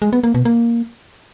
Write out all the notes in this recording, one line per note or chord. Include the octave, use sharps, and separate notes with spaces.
G#3
B3
A#3
B2
A#3